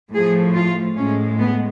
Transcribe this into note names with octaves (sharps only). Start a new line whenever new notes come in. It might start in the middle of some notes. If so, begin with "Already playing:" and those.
A2 F3 A3 G#4
F4
A2 G#3 C#4
B3